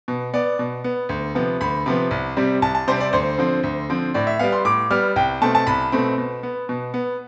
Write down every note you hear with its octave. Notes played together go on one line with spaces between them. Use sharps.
B2
B3 D5
B2
B3
D2
C3 F3 B3
D2 B5
C3 F3 B3
C2
C3 G3 C4
C2 A5
A5
C3 G3 C4 C5
D5
D2 C5
D3 F3 C4
D2
D3 F3 C4
A2 D5
E5
G3 B3 F5
C6
A2 D6
G3 B3 F6
C2 G5
B2 A3 C4 A5
A5
C2 B5
B2 A3 C4
B2
B3
B2
B3